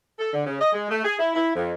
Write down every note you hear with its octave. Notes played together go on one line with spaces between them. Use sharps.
A4
D3
C#3
D#5
G#3
A3
G#4
E4
E4
F2